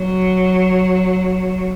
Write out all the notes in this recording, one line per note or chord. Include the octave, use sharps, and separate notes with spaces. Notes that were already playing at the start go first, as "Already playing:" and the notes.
Already playing: F#3